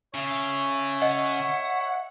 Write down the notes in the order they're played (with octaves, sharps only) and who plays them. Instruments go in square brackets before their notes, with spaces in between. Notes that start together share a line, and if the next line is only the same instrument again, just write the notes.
[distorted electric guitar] C#3 [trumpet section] C#5 E5
[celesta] D#5 [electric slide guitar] F#5